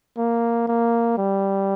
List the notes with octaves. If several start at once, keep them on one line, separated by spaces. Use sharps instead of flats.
A#3
A#3
G3